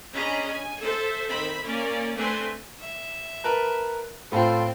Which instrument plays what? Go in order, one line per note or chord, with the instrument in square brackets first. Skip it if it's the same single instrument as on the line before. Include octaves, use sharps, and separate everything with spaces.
[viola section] C#4 D4 G#4 D#5 A#5 B5
G#5
A4 C5 E5
D#3 C4 C5 E5 B5
A#3 C#4 A#4 D5
A3 C4 D4 B4 G#5 C6
[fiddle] E5
[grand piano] A#4 B4 A5
[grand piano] A2 F4 A4 [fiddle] C4